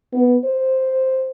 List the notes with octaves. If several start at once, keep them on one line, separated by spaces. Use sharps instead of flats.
B3
C5